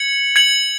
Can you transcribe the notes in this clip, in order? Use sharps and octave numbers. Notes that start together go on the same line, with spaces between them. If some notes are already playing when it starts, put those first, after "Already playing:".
Already playing: G#6 C#7 F#7
G#6 C#7 F#7